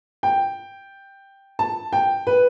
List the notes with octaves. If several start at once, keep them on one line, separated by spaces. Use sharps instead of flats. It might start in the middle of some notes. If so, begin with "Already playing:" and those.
G5
A5
G5
B4